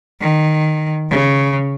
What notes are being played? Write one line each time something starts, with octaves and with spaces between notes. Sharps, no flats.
D#3
C#3